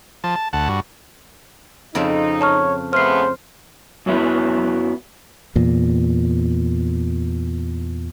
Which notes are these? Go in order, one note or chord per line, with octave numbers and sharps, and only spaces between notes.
F3 A5
A5
D2 F#5 A5
G2 F#4
F2 C#3 C4 D#4
C#5 A5 C#6 F6
C#3 A3 B3 C5 F6 C7
F#2 F#3 B3 E4
E2 A#2